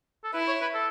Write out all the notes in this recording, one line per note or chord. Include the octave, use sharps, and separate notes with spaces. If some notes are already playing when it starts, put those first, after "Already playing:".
A4
E4 B4
C#5
B4
A4